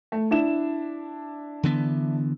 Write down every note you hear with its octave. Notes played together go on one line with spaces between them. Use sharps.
A3
D4 E4 E7
D3 E3 B3